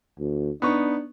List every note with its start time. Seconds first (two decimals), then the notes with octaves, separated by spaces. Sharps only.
0.19 D2
0.62 B3 D4 D#4 C#6